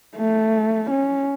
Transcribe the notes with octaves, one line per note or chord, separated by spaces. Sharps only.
A3
C#4